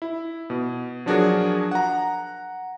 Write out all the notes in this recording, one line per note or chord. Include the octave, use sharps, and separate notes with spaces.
E4
B2
F3 F#3 D4 F#4 G#4 A#4
F#5 A#5